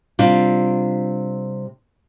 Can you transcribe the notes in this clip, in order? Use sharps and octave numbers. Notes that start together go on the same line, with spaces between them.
C3 G3 D4 F4